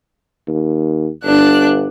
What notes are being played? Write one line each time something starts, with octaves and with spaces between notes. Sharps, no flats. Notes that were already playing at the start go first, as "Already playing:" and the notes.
D#2
G1 D4 F#6